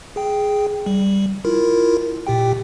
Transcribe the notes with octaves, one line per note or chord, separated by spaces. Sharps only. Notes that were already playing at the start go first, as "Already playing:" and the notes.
G#4 G5
G3
E4 F4 A#4
A#2 G4 G5